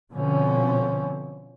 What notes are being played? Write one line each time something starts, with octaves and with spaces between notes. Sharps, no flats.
B2 D3 F3 C4 C#4